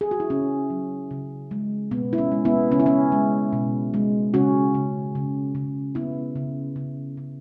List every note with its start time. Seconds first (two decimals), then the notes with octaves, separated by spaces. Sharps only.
0.01 G#4
0.11 F#4
0.20 E4
0.30 C#3 C#4
0.70 F#3
1.11 C#3
1.51 G#3
1.91 B2 B3
2.13 E4
2.18 C#4
2.32 G#3
2.45 B3 E4
2.72 C#3 C#4
2.80 E4
2.86 C#4
3.12 G#3
3.53 B2
3.94 G#3
4.34 C#3 C#4 F#4
4.75 C#3
5.15 C#3
5.55 C#3
5.95 C#3 B3 E4
6.36 C#3
6.76 C#3
7.17 C#3